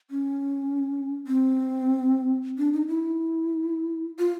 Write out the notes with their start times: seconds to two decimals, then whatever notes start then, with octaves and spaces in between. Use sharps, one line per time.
0.11 C#4
1.27 C4
2.58 D4
2.73 D#4
2.88 E4
4.19 F4